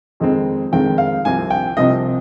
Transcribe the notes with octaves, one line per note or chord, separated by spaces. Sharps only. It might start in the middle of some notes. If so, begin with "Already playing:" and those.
F2 D#3 G#3 C4
F2 D#3 G#3 C4 G5
F5
C2 C3 F3 C4 G#5
G5
C2 C3 F3 C4 D#5